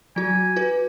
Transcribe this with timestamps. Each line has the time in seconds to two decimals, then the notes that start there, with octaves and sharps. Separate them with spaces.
0.16 F#3 F#4 G#5
0.56 F#4 B4